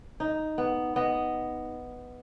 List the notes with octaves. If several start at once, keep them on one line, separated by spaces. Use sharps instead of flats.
D#4
B3
B3 D#5